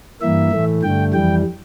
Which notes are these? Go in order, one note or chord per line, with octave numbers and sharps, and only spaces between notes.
G2 E3 A#3 E5
A2 E3 A3
G2 D3 A3 G5
F2 E3 G3 G5